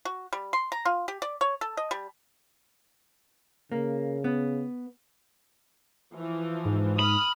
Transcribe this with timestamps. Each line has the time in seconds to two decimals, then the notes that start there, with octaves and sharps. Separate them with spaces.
0.05 F#4
0.33 G3
0.53 C6
0.72 A#5
0.85 F4
1.08 G4
1.22 D5
1.41 C#5
1.61 A4
1.77 D#5
1.91 G3
3.72 C#3 A#3
4.24 B3
6.14 E3 F3
6.65 G#2
6.99 B5 D#6 F6